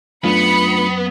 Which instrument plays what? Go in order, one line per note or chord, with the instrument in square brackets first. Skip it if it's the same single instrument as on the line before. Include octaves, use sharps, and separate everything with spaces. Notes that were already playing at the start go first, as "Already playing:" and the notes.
[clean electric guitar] F#2 [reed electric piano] A3 D4 F4 [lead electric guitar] B3 [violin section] B5 C#7